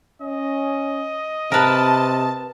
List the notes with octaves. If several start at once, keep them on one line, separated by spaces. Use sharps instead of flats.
C#4 D#5
C3 A#4 B4 A5